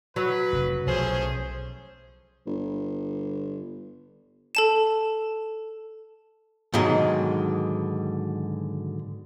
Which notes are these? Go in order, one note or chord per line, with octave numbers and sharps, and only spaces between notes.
F#3 B4
F1 C#3
B1 F3 A3 C#4 G#4 C5
G1
A4 A5 E7
G#2 B2 D3 D#3 F#3 G#3